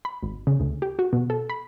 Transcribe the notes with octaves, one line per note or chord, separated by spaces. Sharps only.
B5
G#1
C#3
D2
G4
F#4
B2
A4
B5